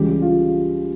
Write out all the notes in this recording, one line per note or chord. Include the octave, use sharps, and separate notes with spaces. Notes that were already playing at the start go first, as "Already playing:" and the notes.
Already playing: C#2 C#3 E3 G3 G4
F4